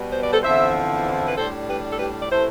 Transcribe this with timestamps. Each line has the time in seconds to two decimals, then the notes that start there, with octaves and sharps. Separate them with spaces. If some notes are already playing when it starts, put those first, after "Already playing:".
Already playing: B2 G3 B3
0.12 C5
0.23 D5
0.32 A4 C5
0.43 E2 D3 F3 C4 E4 C5 E5
1.27 B4
1.37 A2 G3 D4 A4 C5
1.68 G4 B4
1.91 A4
1.99 G4 B4
2.21 D5
2.31 C3 E3 A3 E4 A4 C5